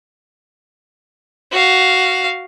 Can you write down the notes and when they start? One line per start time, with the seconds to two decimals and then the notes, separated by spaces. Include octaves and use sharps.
1.52 F#4 F5